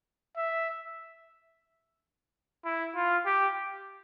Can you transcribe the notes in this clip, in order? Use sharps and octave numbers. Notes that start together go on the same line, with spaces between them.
E5
E4
F4
G4